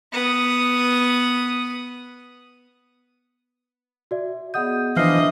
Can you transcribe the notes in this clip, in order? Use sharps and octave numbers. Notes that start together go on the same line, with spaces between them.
B3 D#6
F#4 D5 E5
B3 G#4 D#5 F#5 D#6 G6
E3 F3 D4 D#5 E5 D6 F6 C7